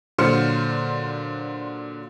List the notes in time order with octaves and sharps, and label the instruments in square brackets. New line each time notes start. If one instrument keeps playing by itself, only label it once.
[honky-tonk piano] A#2 D3 F#3 C5 F6 C#7